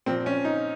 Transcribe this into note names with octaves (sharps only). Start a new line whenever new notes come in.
A#2 F3 C4
C#4
D#4